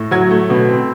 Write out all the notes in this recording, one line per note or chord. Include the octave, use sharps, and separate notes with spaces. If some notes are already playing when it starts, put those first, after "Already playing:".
Already playing: A2
F#3 G#6
A3
B2
C4